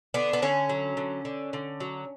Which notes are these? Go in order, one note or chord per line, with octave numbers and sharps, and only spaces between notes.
D3 B3 D4
B3
D3 C#4
F#3
D3
D3
D3
F#3